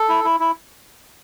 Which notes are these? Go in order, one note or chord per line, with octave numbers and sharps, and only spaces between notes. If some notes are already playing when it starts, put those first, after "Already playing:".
Already playing: A4
E4
E4
E4